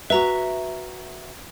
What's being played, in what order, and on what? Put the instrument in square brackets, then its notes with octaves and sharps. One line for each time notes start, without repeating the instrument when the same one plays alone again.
[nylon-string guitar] F#4 E5 [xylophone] B4 A#5